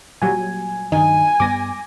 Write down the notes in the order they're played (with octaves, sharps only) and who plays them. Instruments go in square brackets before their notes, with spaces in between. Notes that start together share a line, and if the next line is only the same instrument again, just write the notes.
[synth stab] A#2 F#3 G3 [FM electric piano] G#5
[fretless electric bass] G2 D#3 [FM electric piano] D#4 [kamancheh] G#5
[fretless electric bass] G2 G3 B3 [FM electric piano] D6 A#6